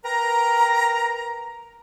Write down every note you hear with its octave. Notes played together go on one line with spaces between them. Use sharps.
A#4 B4 G5 A#5